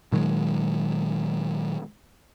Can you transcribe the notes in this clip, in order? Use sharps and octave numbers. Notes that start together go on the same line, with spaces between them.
A#2 D#3 F#3 G#3